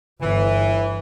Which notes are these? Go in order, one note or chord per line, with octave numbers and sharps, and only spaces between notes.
G1 E3